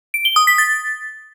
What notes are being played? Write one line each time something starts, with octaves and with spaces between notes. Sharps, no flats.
D7
G7
D#6
B6
A6